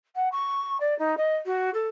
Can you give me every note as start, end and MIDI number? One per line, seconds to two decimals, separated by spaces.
0.15 0.28 78
0.32 0.77 85
0.80 0.97 74
0.98 1.15 63
1.17 1.35 75
1.46 1.70 66
1.73 1.88 69